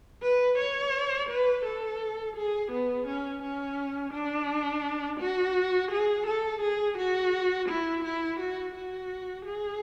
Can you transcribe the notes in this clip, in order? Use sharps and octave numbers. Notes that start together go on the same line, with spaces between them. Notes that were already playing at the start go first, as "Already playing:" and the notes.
B4
C#5
B4
A4
G#4
B3
C#4
C#4
D4
F#4
G#4
A4
G#4
F#4
E4
E4
F#4
F#4
G#4